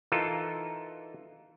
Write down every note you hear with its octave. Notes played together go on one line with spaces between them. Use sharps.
E3 D#4 F4 A4 A#4